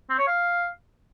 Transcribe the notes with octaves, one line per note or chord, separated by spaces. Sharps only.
C4
C#5
F5